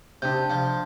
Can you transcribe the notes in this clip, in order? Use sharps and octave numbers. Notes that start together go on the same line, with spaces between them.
C3 D4 G6
F3